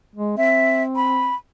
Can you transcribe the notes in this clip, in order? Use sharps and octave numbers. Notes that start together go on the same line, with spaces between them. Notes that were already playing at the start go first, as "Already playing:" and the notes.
G#3
C4 E5
B5